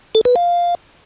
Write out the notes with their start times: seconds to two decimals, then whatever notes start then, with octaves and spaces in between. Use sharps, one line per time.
0.15 A4
0.25 B4
0.36 F5